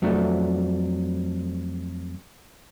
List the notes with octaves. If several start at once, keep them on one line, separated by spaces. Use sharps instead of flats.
F2 F#3 A3 D4